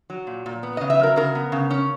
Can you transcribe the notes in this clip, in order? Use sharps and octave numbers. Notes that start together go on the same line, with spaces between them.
F#3
A#2
A#2
B3
C#3 D#5
E5
F#3 A#4
C#3 A#4
B3
C#3
C#4